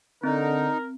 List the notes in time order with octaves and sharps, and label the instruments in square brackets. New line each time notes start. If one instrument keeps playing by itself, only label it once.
[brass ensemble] D3 [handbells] C4 [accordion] D#4 [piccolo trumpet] A#4